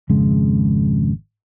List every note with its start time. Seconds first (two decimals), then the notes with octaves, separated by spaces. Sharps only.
0.10 G#1 F2 C#3 G#3